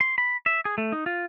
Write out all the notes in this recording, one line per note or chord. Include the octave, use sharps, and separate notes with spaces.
C6
B5
E5
G#4
A3
D#4
F4